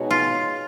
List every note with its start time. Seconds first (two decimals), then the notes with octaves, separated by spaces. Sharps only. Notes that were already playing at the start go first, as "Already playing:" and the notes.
Already playing: B2 G#3 D#4 F#4 C#5
0.11 F4